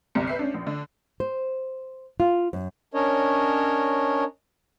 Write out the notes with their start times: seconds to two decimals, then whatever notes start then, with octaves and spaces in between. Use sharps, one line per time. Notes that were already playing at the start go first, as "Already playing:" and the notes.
0.15 G1 C2 C3 A#5 C#7
0.27 B4 E5 G6 C7
0.39 C#4 D4
0.54 A#1
0.67 D3
1.20 C5
2.20 F4
2.53 F#2
2.94 C#4 D4 A#4 C#5 D#5